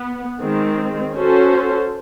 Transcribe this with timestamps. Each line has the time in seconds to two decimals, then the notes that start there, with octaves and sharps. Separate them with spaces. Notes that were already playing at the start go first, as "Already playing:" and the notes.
Already playing: B3
0.40 D#3 G#3 C4
1.14 C#4 F#4 A4 C5